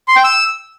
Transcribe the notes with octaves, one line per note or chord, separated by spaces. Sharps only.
C6
G5
E6